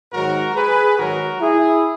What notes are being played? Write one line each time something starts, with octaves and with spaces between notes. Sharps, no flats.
G#2 D#3 F#3 F#4 A#4
G#4 B4
G#2 D#3 F#3 F#4 A#4
E4 G#4